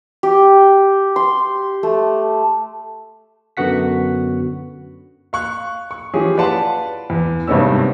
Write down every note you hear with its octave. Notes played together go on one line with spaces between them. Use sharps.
G4
C6
A3
F#2 D3 B3 F#4 F#5 B6
F5 C#6 F#6
C#6
E3 F3 C#4 G4 G#4
B4 D5 F5 F#5 A5 C6
E2
G#1 G2 C3 B3 C#4 E6